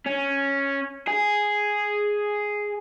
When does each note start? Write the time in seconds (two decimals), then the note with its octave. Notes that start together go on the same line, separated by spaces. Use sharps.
0.06 C#4
1.08 G#4